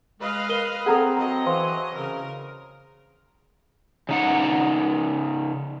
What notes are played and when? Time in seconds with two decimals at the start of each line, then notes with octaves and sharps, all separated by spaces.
0.20 G#3 B4 D#5 F5
0.49 A#4 D#7 G7
0.86 C4 G#4 A4 F#5 A#5 D#6
1.17 F#3 D#5 A#5
1.46 E3 C5 F5 C6
1.95 C#3 A#4
4.09 C#3 D#4 F#5